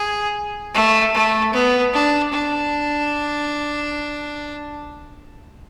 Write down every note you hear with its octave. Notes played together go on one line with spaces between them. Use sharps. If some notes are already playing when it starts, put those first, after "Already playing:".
Already playing: G#4
A3
A3
B3
D4
D4